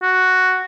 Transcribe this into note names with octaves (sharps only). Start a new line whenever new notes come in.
F#4